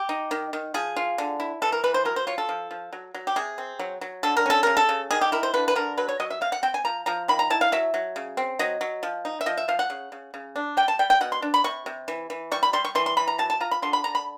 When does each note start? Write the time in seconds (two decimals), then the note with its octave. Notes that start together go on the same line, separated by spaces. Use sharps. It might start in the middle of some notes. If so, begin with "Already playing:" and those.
Already playing: G4
0.09 D#4
0.31 D#3
0.53 D#3
0.74 F3 G#4
0.96 F4
1.18 D3
1.40 E4
1.62 E3 A4
1.72 A#4
1.84 E3 B4
1.94 C5
2.05 F#3 A#4
2.16 C5
2.27 F4 C#5
2.38 A4
2.49 F3
2.71 F3
2.93 F#3
3.14 F#3
3.27 G4
3.36 C3 G#4
3.58 C4
3.79 F#3
4.01 F#3
4.23 D3 A4
4.37 A#4
4.46 C#4 A4
4.63 C#3 A#4
4.77 A4
4.89 C#3
5.11 D#3 G#4
5.21 G4
5.32 E4 A#4
5.43 C5
5.54 D3 B4
5.68 B4
5.76 D3 A#4
5.98 F#3 B4
6.09 C#5
6.20 F#3 D#5
6.30 E5
6.41 C3 F5
6.52 F#5
6.63 C4 G5
6.74 G#5
6.85 F3 A#5
7.06 F3 A#5
7.28 D#3 B5
7.39 A#5
7.50 E4 A5
7.61 F5
7.72 F#3 E5
7.94 F#3
8.16 C#3
8.37 C4
8.59 F#3 D#5
8.81 F#3
9.03 F3
9.25 D#4
9.41 E5
9.46 F3 D#5
9.57 E5
9.68 F3 F5
9.79 F#5
9.90 C#3
10.12 C#3
10.34 C#3
10.56 D4
10.77 G3 G5
10.88 A5
10.99 G3 G5
11.10 G5
11.21 B2 F#5
11.32 C6
11.42 D4
11.54 B5
11.64 C3 C#6
11.86 C3
12.08 E3
12.30 E3
12.52 G3 C#6
12.63 B5
12.73 G3 C6
12.85 C#6
12.95 E3 C6
13.06 C6
13.17 E3 B5
13.28 A#5
13.38 F#3 A5
13.50 A5
13.60 F4 A#5
13.71 B5
13.82 D3 C6
13.93 B5
14.04 D3 A#5
14.15 B5